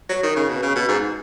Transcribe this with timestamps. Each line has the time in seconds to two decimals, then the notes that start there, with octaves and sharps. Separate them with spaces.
0.09 F#3
0.23 D#3
0.36 C#3
0.49 B2
0.63 C#3
0.76 B2
0.89 G#2